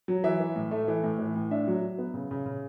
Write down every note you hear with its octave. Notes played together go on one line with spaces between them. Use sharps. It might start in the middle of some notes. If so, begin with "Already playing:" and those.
F#3
E3 E5
E3
A2
A3
E3
A2
E3
A2
D4 E5
F#3
F#3
B3
C#3
C#3
C#3